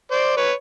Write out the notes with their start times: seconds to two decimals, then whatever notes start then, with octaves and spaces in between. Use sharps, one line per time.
0.11 C5 D5
0.37 B4 C#5